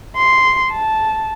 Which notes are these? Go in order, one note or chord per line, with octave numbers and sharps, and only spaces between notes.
C6
A5